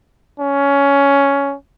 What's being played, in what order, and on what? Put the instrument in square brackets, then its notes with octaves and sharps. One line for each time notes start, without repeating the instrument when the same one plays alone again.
[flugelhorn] C#4